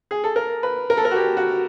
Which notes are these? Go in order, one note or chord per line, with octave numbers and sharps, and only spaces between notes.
G#4
A4
A#4
B4
A#4
A4
A#4
F#4
G4
F#4